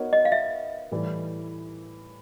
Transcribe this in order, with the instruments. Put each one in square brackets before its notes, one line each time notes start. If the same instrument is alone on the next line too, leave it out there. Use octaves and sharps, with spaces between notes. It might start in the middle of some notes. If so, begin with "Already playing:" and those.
Already playing: [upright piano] B3 D#4 F#4 A#4 C#5
[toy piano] D#5
F5
E5
[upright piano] A2 E3 G3